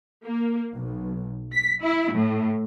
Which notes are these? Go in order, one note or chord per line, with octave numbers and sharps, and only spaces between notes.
A#3
B1
B6
E4
A2